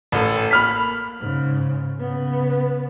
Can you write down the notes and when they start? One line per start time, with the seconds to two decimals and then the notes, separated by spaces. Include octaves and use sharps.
0.12 A1 A4
0.51 A#3 B5 F6 B6
1.20 G#2 C#3
1.98 C#3 B3